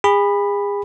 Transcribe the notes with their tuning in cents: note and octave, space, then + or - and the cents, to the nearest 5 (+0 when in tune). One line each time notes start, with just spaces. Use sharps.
G#4 -35 B5 +0